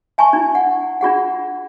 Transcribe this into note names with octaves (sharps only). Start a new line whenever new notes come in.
E5 G#5 A5 C#6
D4 E4
F#5
D4 F4 G#4 F#5